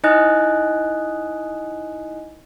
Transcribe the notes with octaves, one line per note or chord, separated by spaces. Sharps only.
D#4 E4 D#5 G#5 D#6 F#6